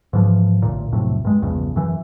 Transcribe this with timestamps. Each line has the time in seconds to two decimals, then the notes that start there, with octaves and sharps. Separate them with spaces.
0.13 G#2 E3 F3
0.62 A1 D2 A#2
0.92 B1 F2 A2 C3
1.25 G2 G#3
1.42 A#1 E2 G2 C#3
1.76 F#2 E3